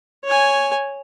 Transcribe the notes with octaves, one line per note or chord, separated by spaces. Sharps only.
C#5 G#5